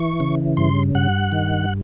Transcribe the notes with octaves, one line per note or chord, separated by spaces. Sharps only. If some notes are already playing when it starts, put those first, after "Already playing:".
Already playing: E3 C#6
C#3
G2 C6
G2 F#5
D#3